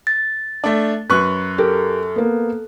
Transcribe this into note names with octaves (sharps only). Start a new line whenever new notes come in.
A6
A3 D4
F#2 B4 C#6 F#6
G4 A4 A#4
A#3 B3